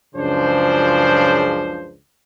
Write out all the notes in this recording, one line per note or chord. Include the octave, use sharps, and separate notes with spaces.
C#2 F#2 C#3 F3 D4 C5